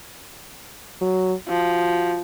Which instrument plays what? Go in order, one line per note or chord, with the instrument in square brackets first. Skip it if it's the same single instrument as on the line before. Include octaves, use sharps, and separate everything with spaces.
[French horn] F#3
[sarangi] F3 [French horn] F#4